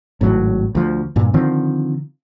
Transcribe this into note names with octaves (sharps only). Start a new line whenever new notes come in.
G#1 A2 F#3
D2 F3
G2 A#2
D3 D#3 F3 C4